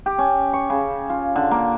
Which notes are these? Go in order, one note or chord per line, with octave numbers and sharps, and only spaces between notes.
G4
C#4
C#6
C#3
F4
D3
A#3